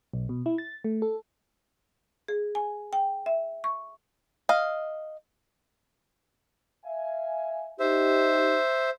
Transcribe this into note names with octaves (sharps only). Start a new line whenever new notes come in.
B1
B2
E4
A6
A3
A4
G#4
G#5
G5
E5
C#6
D#5 F5
E5 F5 G#5
D#4 G4 C5 E5